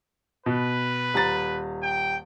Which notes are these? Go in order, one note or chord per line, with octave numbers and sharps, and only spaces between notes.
B2 B4
D#1 A#5 A6
G5